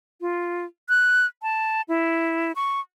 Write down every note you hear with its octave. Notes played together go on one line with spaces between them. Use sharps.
F4
F#6
A5
E4
C#6